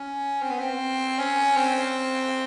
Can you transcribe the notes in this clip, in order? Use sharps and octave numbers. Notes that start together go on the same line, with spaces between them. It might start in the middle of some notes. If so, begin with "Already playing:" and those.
Already playing: C#4
C4
B3
C4
C#4
C4